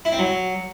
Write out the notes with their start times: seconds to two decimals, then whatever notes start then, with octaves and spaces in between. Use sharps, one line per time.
0.05 E4
0.12 C4
0.19 F#3